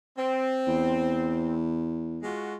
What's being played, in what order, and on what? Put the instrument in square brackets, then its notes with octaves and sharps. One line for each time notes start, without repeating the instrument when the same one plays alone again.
[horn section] C4
[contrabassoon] E2
[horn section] G#3 F4 F#4